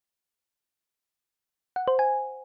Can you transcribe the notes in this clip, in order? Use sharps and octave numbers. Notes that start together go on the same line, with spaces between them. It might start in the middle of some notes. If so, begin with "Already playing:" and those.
F#5
C5
G#5